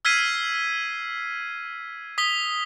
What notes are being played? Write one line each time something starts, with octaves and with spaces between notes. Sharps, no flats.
E6 F6 G#6 B6 C7 D#7
D#6 B6 G7